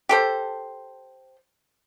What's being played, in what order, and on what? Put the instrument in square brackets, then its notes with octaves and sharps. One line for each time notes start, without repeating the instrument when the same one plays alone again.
[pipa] G4 A4 C5